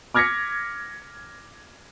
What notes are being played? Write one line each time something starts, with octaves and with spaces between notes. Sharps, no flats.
D6 F6 G#6 A#6 B6 C#7